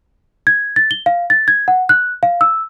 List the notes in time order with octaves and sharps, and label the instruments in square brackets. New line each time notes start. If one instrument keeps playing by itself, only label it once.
[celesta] G#6
A6
G7
F5
A6
G#6
F#5
F#6
F5
E6